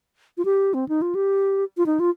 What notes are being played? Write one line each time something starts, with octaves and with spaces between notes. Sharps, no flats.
F4
G4
C4
D#4
F4
G4
F4
D#4
F4